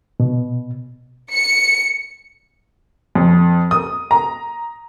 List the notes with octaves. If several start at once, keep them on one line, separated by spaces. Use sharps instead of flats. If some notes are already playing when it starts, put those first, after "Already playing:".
B2
C#7
F2
D#6
A#5